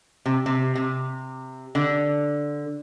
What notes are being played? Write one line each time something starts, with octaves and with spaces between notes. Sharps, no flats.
C3
C3
C3
D3